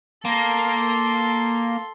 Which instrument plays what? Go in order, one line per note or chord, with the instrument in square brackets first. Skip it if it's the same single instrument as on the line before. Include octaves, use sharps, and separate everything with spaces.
[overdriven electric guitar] A#3 [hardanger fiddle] A4 C6